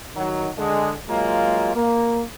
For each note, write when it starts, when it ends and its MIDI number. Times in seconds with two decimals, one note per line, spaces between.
0.16 0.48 51
0.16 0.48 54
0.58 0.93 50
0.58 0.93 56
1.09 1.72 54
1.09 1.72 56
1.09 1.72 58
1.09 1.72 65
1.75 2.22 58